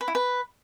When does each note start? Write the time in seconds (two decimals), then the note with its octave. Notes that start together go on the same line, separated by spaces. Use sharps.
0.01 B4
0.08 E4
0.15 B4